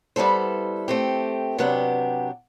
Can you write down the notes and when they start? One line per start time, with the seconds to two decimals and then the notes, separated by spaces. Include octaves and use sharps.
0.16 G3 B3 E4 A4 C5
0.88 A3 C4 G4
1.58 C3 F#3 B3 D4 G4